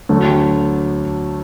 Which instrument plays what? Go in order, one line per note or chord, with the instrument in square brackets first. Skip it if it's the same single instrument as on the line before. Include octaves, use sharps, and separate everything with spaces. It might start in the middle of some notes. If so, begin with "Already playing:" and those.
[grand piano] D2 D3 F#3 A3